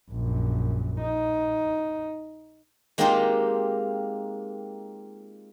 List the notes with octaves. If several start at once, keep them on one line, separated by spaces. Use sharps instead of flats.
A#1 F#2
D#4
G#3 A#3 C4 D#4 F4 G4